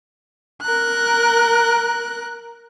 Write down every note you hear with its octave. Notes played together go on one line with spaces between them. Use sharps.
A#4 F#6